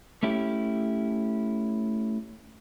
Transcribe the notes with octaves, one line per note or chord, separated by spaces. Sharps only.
A3 C#4 E4 G4